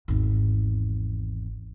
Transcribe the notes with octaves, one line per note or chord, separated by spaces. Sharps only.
G#1 E2